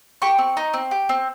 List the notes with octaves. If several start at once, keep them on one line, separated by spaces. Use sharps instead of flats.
G4 C#6
C4
D#4
C4
G4
C4